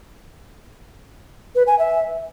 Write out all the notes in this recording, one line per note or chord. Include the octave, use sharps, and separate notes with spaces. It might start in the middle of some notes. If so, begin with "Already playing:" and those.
B4
G#5
E5